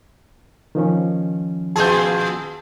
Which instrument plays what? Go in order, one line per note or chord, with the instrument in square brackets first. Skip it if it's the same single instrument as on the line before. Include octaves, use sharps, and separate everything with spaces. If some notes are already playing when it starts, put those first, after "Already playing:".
[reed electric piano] D#3 F3 C#4
[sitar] A#2 F4 G#4 [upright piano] A5 G6